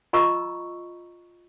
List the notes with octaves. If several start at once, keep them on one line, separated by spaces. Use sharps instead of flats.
F4 D#5 A#5 B5 C#6 E6